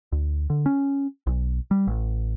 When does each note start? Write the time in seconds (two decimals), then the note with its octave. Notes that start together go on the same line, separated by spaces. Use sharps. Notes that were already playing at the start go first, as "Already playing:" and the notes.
0.12 D2
0.50 D3
0.66 C#4
1.27 B1
1.71 G3
1.87 A1